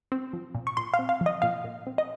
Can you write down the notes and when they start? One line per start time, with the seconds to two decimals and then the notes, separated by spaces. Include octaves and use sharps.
0.12 C4
0.33 F3
0.55 A#2
0.67 C#6
0.77 A#2 C6
0.94 F5
0.99 C4
1.09 F5
1.21 F3
1.26 D#5
1.42 A#2 F5
1.64 A#2
1.87 C4
1.98 D#5